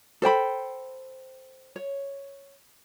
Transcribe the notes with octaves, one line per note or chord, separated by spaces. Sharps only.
A4 C5 G5 B5
C#5